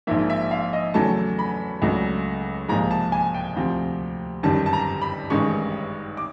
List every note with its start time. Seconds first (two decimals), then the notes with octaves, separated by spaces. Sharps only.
0.07 A#1 G#2 F3 A#3 E5
0.30 E5
0.51 F5
0.73 D#5
0.94 E2 C#3 F#3 A3 A5
1.39 B5
1.82 C#2 C#3 F#3 A3 D4
2.69 C2 A#2 F3 G#3 A#5
2.91 A5
3.12 G#5
3.34 G5
3.56 D2 C3 F3
4.43 G1 F#2 D#3 G3 A5
4.66 A5
4.73 A#5
5.02 B5
5.30 A1 G2 D#3 G#3 C#4 C#6
6.17 D6